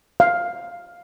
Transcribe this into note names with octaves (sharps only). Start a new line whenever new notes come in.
F5